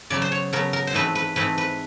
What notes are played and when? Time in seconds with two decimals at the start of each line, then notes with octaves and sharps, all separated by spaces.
0.10 C#3 F#3 B3 D5
0.22 C5
0.32 C#5
0.53 C#3 F#3 B3 A#4
0.73 A#4
0.87 C5
0.93 G#2 E3 A3 C4 B4
1.15 B4
1.36 G#2 E3 A3 C4 B4
1.58 B4